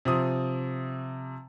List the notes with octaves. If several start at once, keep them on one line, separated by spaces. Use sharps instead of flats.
C3 F3 D#6